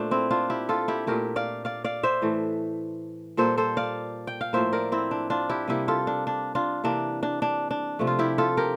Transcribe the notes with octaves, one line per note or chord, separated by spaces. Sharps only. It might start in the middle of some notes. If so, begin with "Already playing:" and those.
Already playing: A#2 A3 D4 C5
C4 E4
D4 F4
E4 G4
F4 A4
E4 G4
A#2 A3 G4 A#4
D5 F5
D5 F5
D5 F5
C5 E5
A2 E3 A3
A#2 G3 A#3 A4 C5
A4 C5
D5 F5
G5
F5
A2 F3 A#3 C5 E5
A#4 D5
C4 E4
D4
D4 F4
E4 G4
C3 G3 A#3 E4 G4
F4 A4
D4
D4
D4 F4
C3 E3 A#3 D4
D4
D4
D4
C3 F3 A3
F4
E4 G4
F4 A4
G4 A#4